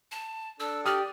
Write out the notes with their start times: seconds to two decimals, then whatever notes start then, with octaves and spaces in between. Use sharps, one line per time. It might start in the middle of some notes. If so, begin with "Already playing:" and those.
0.12 A5
0.60 D4 A4 E6
0.86 G4 D5 D#6 F6